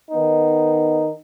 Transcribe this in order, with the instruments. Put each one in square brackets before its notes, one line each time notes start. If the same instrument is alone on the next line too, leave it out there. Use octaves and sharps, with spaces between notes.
[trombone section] D#3 B3 D#4